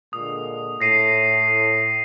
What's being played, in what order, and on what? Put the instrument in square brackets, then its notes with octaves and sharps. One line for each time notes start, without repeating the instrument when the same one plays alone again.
[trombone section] A#2 D3 G#3 [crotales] D#6
[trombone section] A2 [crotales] A#6 C7 D#7